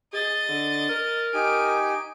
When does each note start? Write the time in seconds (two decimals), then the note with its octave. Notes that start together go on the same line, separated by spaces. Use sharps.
0.13 G#4 D#5 A6
0.49 D3
0.89 A#4
1.34 D#4 G4 G#5 D7